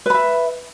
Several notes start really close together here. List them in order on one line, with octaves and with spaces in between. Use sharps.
B4 B5 E5